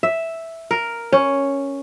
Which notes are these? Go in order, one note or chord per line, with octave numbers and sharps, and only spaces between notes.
E5
A#4
C#4